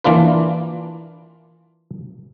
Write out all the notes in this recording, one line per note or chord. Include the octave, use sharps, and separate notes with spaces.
E3 A#3 D4 F4 B4